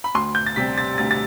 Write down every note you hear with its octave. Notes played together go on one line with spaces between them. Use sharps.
B5
D2 C6
G6
A6
C3 G3 C4 B6
A6
D2 A6
A6